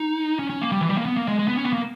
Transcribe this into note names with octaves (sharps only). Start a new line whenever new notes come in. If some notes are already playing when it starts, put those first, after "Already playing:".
Already playing: D#4
C#4
C#4
A#3
G3
E3
G3
A#3
B3
A#3
G#3
G#3
B3
C#4
B3
A#3